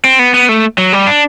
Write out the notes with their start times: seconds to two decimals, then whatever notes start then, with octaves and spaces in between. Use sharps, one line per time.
0.05 C4
0.19 B3
0.34 B3
0.49 A3
0.78 F#3
0.93 G3
1.07 D4